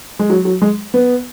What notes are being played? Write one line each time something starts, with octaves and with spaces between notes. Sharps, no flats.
G#3
F#3
F#3
G#3
B3